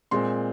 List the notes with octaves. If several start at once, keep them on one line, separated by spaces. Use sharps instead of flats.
A#2 G#3 C4 C6